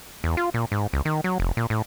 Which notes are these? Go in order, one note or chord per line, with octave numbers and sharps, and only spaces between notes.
E2
F4
A#2
G#2
C#2
D#3
F#3
F1
A#2
A2